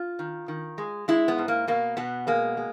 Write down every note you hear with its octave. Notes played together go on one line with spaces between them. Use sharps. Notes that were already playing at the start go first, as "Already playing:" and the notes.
Already playing: F4
D#3
D#3
G#3
G#3 E4
B3
G#2
A#3
B2 A#3
B2 B3
G#3 A#3
G#3